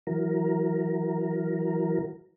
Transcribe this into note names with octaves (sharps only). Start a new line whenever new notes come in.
E3 F#3 A#4